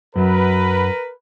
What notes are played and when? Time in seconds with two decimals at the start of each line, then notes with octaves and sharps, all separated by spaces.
0.16 F#2 F#3 A#4 B4